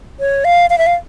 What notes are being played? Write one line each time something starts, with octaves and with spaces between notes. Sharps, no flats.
C#5
F5
F5
E5
F5